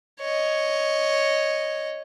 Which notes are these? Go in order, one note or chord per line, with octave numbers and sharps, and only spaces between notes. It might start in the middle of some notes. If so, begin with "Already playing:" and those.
C#5 D#5